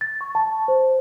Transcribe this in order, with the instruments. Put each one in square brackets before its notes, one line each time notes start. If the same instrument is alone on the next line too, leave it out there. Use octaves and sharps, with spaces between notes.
[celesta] A6
C#6
A5
C5